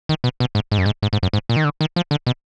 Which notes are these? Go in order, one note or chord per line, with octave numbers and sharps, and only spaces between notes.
D#3
B2
B2
G#2
G#2
F#2
G#2
G#2
G#2
F#2
G#2
A#2
D#3
D3
D#3
F3
D3
B2